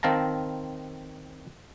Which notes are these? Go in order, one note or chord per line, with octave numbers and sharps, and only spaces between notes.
D#3 C4 F5 A5 A#5